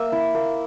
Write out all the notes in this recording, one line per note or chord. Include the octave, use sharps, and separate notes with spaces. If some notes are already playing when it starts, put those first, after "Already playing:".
Already playing: A#3 E5
E4
A#3